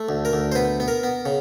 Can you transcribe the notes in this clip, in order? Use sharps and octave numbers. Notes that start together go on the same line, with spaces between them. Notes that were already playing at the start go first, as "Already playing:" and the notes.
Already playing: A3
D2
A#4
D2
C5
B3 B4
B3
A#4
B3
C#3